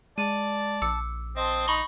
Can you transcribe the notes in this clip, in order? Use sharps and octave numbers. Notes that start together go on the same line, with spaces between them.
G#3 D5 A5 D#7
A#1 D6 E6 C#7
C4 D#5 A5 C6 D#6
D#4 B5 C#6 G7